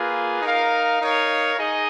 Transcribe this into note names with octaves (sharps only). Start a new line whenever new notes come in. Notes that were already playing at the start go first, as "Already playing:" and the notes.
Already playing: A#3 F4 G#4 B4
D#4 A#4 F5
D#4 A#4 C#5 F5
D#4 G#4 D#5